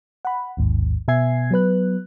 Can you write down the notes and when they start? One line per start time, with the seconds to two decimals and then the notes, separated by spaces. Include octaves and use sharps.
0.25 F#5 B5
0.57 A1 D#2 G#2
1.08 B2 B3 E5 G#5 G#6 C7
1.51 F#3 B3 B4 F#6